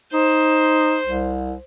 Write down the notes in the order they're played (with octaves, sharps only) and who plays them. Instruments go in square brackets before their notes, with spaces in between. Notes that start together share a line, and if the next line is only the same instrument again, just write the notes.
[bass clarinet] D#4 [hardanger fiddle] C5
[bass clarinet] C2